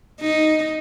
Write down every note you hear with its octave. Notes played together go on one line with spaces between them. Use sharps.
D#4